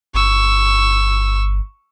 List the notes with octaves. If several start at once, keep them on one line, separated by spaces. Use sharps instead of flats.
G1 C#6 E6